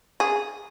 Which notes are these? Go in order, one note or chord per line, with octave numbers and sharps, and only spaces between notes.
G#4